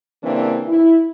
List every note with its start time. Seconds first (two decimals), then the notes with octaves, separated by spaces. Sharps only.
0.23 C#3 E3 G3 A#3 C4 D4
0.68 E4